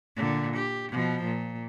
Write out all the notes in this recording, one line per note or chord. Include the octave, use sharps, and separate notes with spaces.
A#2 D3
G4
B2 F3
A#2